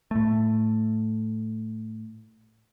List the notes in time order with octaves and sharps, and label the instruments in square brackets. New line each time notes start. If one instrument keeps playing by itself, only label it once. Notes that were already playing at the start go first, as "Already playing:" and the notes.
[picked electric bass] A2 A3